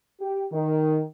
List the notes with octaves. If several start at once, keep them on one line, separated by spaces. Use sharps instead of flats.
G4
D#3